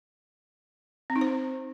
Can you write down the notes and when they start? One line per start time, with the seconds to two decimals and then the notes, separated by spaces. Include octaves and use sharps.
1.10 C4
1.16 D#4
1.21 C5